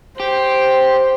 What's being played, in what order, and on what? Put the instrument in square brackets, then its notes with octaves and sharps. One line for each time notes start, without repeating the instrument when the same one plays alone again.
[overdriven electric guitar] G4 [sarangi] C5